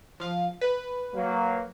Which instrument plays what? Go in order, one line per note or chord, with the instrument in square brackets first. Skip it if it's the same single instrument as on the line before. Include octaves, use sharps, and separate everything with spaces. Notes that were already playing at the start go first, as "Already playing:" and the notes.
[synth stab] F3 F5
B4
[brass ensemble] F#3 A#3